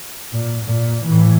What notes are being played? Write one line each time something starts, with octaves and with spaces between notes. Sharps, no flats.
A#2
A#2
A2 E3